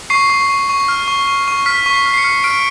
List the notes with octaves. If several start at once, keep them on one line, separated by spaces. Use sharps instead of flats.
C#6 C7
C#6
C#6
C#6
F6
C#6
C#6
C#6
F6 B6
C#6
C7
F6
C7
C#7
F6
F6 D7